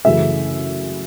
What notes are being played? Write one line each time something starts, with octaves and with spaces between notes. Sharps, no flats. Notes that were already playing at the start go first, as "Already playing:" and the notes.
F#2 C#3 E3 A3 E5